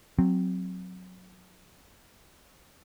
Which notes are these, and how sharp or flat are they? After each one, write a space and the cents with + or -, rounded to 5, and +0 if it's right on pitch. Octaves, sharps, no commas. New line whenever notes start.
F#3 -10 C4 +0